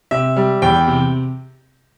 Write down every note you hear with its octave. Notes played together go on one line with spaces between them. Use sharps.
C3 E5
G3
E2 G5
C3